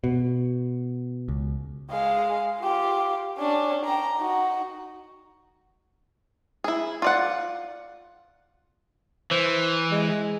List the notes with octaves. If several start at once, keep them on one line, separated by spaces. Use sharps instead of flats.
B2
C#2
G#3 F5
F4 G4
C#4 D4
G5 A#5
D#4 F#4
E4 G#4
F4 D5 F#5
E3 C5
G#3